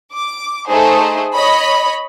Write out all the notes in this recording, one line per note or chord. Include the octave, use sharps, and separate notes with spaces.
D6
A3 D#4 G#4 C5
C#5 D#5 B5